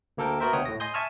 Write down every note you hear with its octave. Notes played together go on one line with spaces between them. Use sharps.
D2 A#3 A4 A#4 G5
B3 F#4 A#4 C5 E5
D2 B2 C#5 F#5 G5 D#6
A2 A#6
D#5 G#5 C6 D#6 G6
E5 G#5 A5 C#6 E6 F6